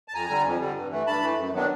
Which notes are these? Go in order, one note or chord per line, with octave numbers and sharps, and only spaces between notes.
A5
F2 G#5 A#5
D3 G3
F2
D3 G3
G2
E3 A3
G2 A5 B5
E3 A3
F#2
D#3 F#3 B3 D4